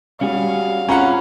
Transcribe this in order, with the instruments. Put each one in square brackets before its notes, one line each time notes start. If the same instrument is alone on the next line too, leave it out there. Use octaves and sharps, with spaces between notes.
[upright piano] G3 [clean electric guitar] C#4 F#4 G#4 [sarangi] F5
[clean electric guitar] C4 G#4 C5 [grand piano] C#4 F#5 [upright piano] F4 A#5 B5